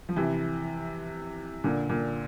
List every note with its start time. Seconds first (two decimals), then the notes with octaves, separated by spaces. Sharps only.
0.09 F3
0.16 C3 E3
1.64 A#2 D3
1.89 A#2